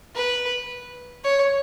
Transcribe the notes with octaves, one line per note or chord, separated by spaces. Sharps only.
B4
C#5